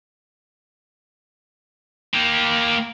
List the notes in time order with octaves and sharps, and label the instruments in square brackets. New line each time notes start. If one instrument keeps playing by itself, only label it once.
[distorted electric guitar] A#3 G4